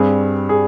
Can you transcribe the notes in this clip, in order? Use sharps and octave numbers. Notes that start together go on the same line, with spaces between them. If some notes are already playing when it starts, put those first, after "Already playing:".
Already playing: G2 G3 C4 G#4
G#4